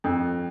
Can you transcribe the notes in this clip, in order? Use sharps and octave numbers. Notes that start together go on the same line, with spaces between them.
F2